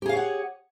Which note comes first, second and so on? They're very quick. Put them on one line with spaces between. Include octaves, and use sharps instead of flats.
G4 G#4 F5 C#5 F#5